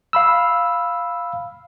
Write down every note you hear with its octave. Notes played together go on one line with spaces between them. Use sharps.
F5 B5 E6